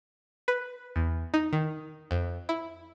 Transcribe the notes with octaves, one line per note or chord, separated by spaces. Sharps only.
B4
E2
D#4
D#3
F2
E4